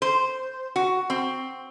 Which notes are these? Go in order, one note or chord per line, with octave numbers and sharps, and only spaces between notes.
C5
F#4
C4